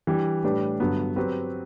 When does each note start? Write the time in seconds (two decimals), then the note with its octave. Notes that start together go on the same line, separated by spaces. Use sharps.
0.07 E3 G3 D4 G4
0.44 A2 G3 D4 G4 B4
0.80 G2 D3 F#3 B3
1.16 F#3 C4 G4 B4